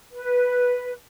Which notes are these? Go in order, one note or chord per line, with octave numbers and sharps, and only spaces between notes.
B4